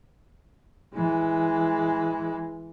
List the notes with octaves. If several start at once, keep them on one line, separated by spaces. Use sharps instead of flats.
E3 G#3